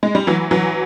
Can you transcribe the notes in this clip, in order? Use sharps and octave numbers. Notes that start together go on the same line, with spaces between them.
G#3
G3
E3 F#3
E3 F#3